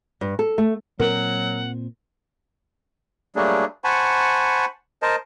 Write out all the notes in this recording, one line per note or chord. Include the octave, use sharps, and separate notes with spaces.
G2
A4
A3
A#2 F#3 C4 A#4 F#5
F#3 G3 A3 A#3 D4 G#4
C5 F#5 G#5 A5 B5 C#6
A#4 C5 D#5 A5